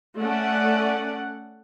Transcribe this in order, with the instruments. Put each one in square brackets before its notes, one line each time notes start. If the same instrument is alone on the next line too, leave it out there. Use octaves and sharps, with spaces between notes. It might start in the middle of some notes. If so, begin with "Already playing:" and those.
[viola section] A3 C#4 D5 F#5